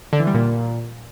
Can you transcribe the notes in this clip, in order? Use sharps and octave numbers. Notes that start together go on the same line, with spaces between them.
D3
E3
G3
A#2